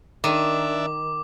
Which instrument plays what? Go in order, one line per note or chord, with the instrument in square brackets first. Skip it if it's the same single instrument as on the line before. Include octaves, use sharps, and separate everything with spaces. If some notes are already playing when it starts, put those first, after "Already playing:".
[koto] D#3 [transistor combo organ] D4 E5 [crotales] D6